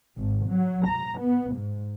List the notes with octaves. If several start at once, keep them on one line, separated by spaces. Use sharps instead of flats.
G#1
F#3
A#5
B3
G#2